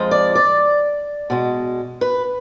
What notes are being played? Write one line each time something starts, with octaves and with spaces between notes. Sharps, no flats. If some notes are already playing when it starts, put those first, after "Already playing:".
Already playing: F2 F3 G#3
D5
D5
B2 G#3
B4